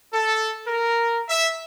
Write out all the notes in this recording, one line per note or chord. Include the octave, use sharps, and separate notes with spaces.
A4
A#4
E5